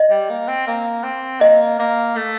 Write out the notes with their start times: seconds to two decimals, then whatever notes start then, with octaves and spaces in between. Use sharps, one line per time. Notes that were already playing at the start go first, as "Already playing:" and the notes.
Already playing: D#5
0.10 G3
0.29 A#3
0.48 C4
0.67 A#3
1.04 C4
1.41 A#3 D#5
1.79 A#3
2.16 A3